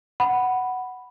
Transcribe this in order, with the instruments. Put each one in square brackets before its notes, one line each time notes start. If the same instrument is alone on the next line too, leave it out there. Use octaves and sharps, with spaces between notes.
[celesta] F#5 B5